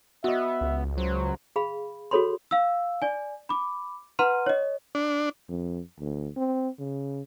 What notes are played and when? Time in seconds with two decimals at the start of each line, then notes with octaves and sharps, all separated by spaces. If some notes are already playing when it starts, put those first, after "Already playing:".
0.24 B3 F#4 D#5 E5
0.61 C#2
0.98 F#3 C5
1.56 G#4 F5 B5
2.11 F#4 G#4 A4 C#5 B5 C6
2.51 F5 E6
3.02 D5 G#5
3.49 B5 D6
4.19 B4 F#5 A#5 C6 F6 D#7
4.46 C#5 D#5
4.95 D4
5.49 F2
5.99 D2
6.36 C4
6.79 C#3